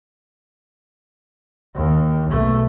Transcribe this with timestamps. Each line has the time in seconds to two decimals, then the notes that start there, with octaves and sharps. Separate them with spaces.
1.75 D#2
2.29 B1 A3